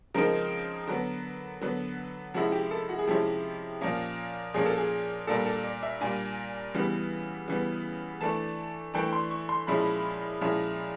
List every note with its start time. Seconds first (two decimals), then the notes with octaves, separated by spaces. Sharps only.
0.15 C#3 F3 G#3 C4 D#4 A#4
0.87 D3 F#3 B3
1.61 D3 F#3 B3
2.34 C3 F3 G#3 C#4 E4 F#4
2.52 G4
2.71 A4
2.89 F#4
2.99 G#4
3.07 C3 F3 G#3 C#4 E4 G4
3.81 A#2 F3 A#3 C#4
4.54 A#2 F3 A#3 C#4 G#4
4.66 A4
4.77 G#4
5.27 A#2 G3 A#3 D4 A4
5.46 A4
5.64 D5
5.83 E5
6.01 A#2 G3 A#3 D4 G#5
6.74 C#3 E3 G3 B3
7.48 C#3 E3 G3 B3
8.21 E3 A3 D4 A5
8.94 E3 A3 D4 G5
9.13 C6
9.31 C#6
9.49 C6
9.67 A#2 F3 G#3 C#4 E4 B5
10.41 A#2 F3 G#3 C#4 E4